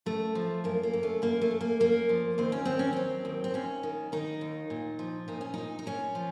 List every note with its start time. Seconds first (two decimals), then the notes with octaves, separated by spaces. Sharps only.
0.06 F#2 A3
0.35 F3
0.64 F#2 A#3
0.83 A#3
0.93 F#2
1.03 A3
1.22 F#2 A#3
1.42 A3
1.51 F#2
1.61 A#3
1.80 F#2 A#3
2.09 F3
2.38 D#2 C4
2.52 C#4
2.65 D#2 C4
2.79 C#4
2.93 F#3 C4
3.25 D#2
3.44 C4
3.54 D#2 C#4
3.83 D#3
4.12 D#3 D#4
4.41 D#2
4.70 A#2
4.99 F3
5.28 A#2 D#4
5.41 C#4
5.54 A#2 D#4
5.79 D#4
5.86 A#2 C#4
6.15 F3